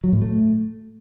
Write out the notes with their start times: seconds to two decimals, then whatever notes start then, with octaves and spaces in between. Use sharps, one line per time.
0.04 F#3
0.13 A2
0.21 A3